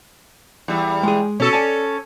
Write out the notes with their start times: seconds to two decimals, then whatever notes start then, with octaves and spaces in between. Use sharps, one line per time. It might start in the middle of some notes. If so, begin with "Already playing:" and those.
0.68 E2 G3
1.03 G#3 G#4
1.40 B2 C#4 A4
1.53 D5 G#5 A5